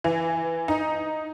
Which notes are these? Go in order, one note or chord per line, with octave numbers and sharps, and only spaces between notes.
E3
D#4